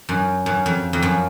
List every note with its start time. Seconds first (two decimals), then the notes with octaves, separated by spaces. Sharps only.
0.09 F#2
0.46 F#2
0.66 F2
0.93 F2
1.02 F#2